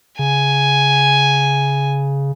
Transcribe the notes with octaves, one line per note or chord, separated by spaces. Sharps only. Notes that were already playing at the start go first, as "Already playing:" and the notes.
C#3 G#5